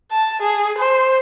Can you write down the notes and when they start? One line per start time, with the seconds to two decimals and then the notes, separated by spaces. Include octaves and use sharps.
0.12 A5
0.42 G#4
0.78 C5